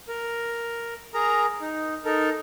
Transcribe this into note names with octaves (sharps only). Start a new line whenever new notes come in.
A#4
G#4 A#4 A#5
D#4
D#4 A4 A#4